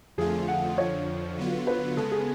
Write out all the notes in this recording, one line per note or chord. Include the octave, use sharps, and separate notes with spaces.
F2 D3 F3 A3 F4 G#4
F#5
F2 D3 F3 C#5
D3 F#3 B3 F4
B4
C#3 G#3 B3 A4
G#4